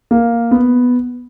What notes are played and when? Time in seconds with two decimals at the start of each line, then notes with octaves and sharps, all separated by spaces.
0.11 A#3
0.51 B3